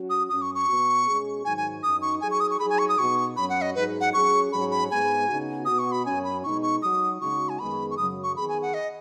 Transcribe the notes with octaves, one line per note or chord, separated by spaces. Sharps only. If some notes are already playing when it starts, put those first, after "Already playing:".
Already playing: F#3 C#4 F#4
D#6
F#2 F#3 C#4 D#6
C#6
C#6
B2 B3 F#4
B2 G#3 C#4 G#4
G#2 D#3 F#3 D#4 G#5
G#5
F#2 F#3 D#4 D#6
C#6
F#3 D#4 G#4 G#5
C#6
D#6
C#6
F#3 D#4 G#4 B5
G#5
C#6
D#6
B2 B3 D#4 F#4 C#6
F#2 F#3 C#4 B5
F#5
D#5
G#2 F#3 D#4 G#4 B4
F#5
F#3 C#4 G#4 C#6
G#2 F#3 C#4 G#4 B5
B5
G#2 G#3 B3 G#4 G#5
C#3 B3 D#4 F#4
B2 B3 F#4 D#6
C#6
B5
F#2 F#3 C#4 G#5
B5
B2 G#3 D#4 C#6
C#6
F#3 D#4 F#4 D#6
C#3 G#3 D#4 F#4 C#6
G#5
F#2 D#3 G#3 B3 G#4 B5
C#6
F#2 C#3 F#3 D#6
C#6
D#3 B3 G#4 B5
G#5
F#5
D#5